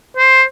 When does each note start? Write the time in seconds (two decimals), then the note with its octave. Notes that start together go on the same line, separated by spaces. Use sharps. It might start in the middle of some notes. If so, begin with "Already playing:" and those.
0.17 C5